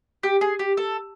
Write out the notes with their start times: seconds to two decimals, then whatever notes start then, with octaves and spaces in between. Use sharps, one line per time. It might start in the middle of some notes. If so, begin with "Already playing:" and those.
0.23 G4
0.41 G#4
0.59 G4
0.77 A4